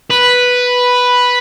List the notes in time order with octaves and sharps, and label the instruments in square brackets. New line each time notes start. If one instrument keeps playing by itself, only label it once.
[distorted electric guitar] B4